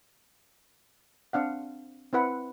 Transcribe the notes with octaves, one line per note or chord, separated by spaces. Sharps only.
C4 D4 F5 F#5
C4 E4 B4 F#5